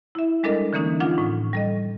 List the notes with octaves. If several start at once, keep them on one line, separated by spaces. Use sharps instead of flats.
E4 E5
G3 G#3 D4 A4 A#4 D#5
D3 E3 A#3 C#4 D#4
F3 D4 F4 F#5
A2
G3 A4 D#5